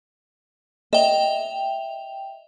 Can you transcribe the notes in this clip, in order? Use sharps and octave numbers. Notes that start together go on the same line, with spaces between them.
D#5 E5 G5 F7